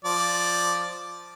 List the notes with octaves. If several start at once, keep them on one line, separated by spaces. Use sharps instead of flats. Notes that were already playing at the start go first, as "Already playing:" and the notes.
F3 D5